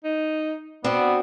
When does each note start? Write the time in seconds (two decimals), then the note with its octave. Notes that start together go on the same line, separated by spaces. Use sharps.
0.04 D#4
0.84 B3 C4 D4 F#4 D5